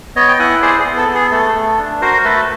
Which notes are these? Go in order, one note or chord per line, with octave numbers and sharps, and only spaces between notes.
B3 C#5 D#5
G5
E4 F#5 G#5
G#4 C5 D5
G#4
B3
A4
B3
G#4
A3 A4
A3
D4
F#4 A#4 C5
A3 A4 B4